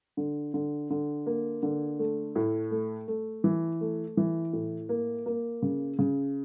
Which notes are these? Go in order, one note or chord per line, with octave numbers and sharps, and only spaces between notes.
D3
D3
D3
A#3
D3
A3
A2
A3
A3
E3
A3
E3
A2
A#3
A#3
C#3
C#3